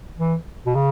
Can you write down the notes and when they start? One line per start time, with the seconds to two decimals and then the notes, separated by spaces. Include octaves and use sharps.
0.18 E3
0.66 B2
0.75 C#3